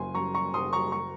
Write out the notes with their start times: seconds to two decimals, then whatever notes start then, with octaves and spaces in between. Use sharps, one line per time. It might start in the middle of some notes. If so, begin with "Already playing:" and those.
Already playing: F#1 F#2 G#5 C6
0.15 F#2 A#5 C#6
0.34 A#5 C#6
0.54 F#1 C6 D#6
0.73 A#5 C#6
0.92 A#5 C#6